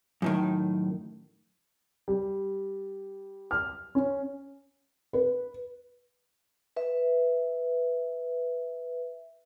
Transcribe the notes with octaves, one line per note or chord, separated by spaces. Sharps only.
F#2 A2 D#3
G3
F6
C#4
B4
B4 E5